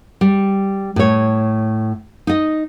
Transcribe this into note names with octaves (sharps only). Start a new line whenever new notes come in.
G3
A2 C#5
D#4 D#5